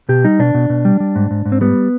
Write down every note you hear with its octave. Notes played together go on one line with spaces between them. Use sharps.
B2 G4
G3 D#4
B2 D4
B2
B2
G3
G3
G#2
G#2
G#2
C4
G3 B3